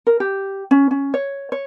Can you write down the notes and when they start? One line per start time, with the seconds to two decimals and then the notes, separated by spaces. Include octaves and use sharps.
0.07 A#4
0.20 G4
0.71 C#4
0.91 C#4
1.14 C#5
1.52 C#5